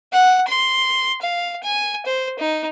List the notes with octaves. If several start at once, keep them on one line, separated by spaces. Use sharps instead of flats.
F#5
C6
F5
G#5
C5
D#4